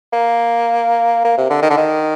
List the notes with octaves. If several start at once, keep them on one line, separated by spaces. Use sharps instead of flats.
A#3
A#3
C3
D3
D#3
D3
D#3